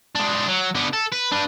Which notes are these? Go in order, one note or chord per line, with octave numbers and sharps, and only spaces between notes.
G#3 D4
F#3
D3 B3
A4
B4
D4 B4